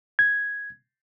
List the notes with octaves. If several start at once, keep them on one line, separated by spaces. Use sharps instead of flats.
G#6